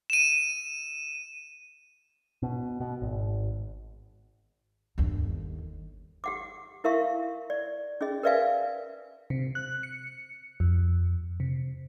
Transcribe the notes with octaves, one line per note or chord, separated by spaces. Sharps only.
D#7 E7
B2
B2
G#1
G1 D#2
G4 F#5 D6
E4 A#4 E5 F5 C#6
D5
C#4 G#4 D#5
A#4 B4 D5 E5 F5 G#5
C3
F#6
C#7
F2
C3